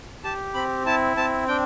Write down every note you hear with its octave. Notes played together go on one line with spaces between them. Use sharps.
G4 A5
C4 B5
E4 A5
C4 A5
D4 G5